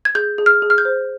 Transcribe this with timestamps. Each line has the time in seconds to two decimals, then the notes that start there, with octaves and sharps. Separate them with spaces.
0.05 G#6
0.15 G#4 G6
0.38 G#4
0.46 F6
0.62 G#4
0.70 F6
0.78 G6
0.85 C5